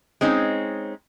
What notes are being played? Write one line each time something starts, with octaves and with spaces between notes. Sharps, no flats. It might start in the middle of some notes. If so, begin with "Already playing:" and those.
G#3 C4 C#4 D#4